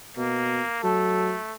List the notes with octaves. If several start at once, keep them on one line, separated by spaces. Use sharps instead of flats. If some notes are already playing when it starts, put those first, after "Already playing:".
B2 A#3
F#3 A3 A4